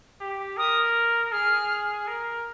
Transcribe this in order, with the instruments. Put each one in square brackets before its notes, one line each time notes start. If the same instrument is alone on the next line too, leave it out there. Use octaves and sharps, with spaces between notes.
[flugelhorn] G4
[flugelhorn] A#4 [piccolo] D#6
[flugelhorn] G#4 [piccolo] F6
[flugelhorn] A#4